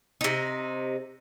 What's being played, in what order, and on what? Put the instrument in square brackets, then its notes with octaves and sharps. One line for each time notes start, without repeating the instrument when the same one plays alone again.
[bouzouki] C3 D#4